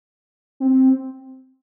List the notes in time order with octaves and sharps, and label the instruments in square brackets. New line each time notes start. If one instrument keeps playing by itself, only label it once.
[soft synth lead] C4